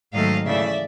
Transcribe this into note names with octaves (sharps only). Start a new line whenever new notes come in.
G#2 D#3 F#3 A3 D#5 F5
C#3 E3 A3 D5 E5